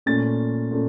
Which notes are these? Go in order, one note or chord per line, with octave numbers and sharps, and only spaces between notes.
A#2 A3 C#4 A6
A#2 A3 C#4